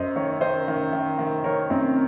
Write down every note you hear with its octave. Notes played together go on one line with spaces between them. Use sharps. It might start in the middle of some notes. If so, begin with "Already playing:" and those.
Already playing: F#2 C5 D#5
D#3 A#4 C#5
D#3 C5 D#5
D#3
D#3
D#3
D#3 A#4 C#5
F#2 C4 D#4